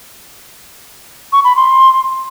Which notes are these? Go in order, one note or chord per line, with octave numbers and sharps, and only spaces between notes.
C#6
B5
C6